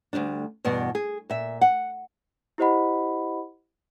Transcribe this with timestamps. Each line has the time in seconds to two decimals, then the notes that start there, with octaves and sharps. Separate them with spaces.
0.13 D2 G#2 G3 D4
0.65 E2 G2 B2 B3
0.95 G#4
1.30 A#2 E5
1.61 F#5
2.58 E4 G4 C5 D#5 F#5 B5